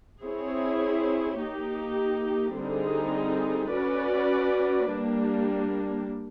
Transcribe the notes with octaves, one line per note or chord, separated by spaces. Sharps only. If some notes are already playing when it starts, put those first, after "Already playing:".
C4 E4 G#4 C#5
A#3 D#4 G4
D3 G3 C4 D#4 G#4
C#4 F#4 B4 D5
G3 A#3 D4